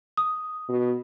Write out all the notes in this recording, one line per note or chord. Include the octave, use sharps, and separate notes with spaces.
D#6
B2